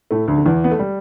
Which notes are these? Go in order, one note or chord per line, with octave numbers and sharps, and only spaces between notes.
A2 A3
D2 D3
D3
E2 E3
B3
A3
G3